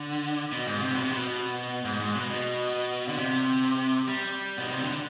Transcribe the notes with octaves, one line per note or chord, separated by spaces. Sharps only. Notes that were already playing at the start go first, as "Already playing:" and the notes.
Already playing: D3
B2
G#2
C3
B2
C3
B2
G#2
G#2
B2
B2
D3
C3
G3
B2
C3
D3